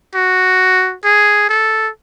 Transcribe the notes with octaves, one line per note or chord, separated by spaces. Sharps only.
F#4
G#4
A4